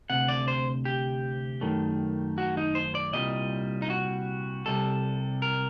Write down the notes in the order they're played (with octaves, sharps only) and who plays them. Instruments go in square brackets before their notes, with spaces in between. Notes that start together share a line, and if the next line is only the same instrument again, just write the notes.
[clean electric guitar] D2 C3 F#5
D5
C5
G4
F#2 D#3 A3
F#4
D#4
C5
D5
C2 A#2 G3 D#5
D#4
F#4
C2 C3 G3 A4
A#4